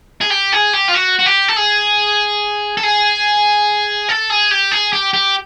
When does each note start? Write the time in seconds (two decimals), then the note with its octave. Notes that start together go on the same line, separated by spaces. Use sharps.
0.21 G#4
0.30 G4
0.52 G#4
0.73 G4
0.88 F4
0.94 F#4
1.19 F#4
1.26 G4
1.48 A4
1.56 G#4
2.77 A4
2.83 G#4
4.09 A4
4.30 G#4
4.51 G4
4.71 G#4
4.93 G4
5.13 G4